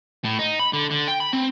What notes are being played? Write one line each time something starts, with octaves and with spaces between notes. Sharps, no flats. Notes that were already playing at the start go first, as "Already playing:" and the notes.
A2
D#4
B5
D3
D3
G5
B5
C4